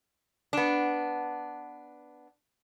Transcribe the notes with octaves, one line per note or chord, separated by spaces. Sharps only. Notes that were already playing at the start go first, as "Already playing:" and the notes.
B3 D4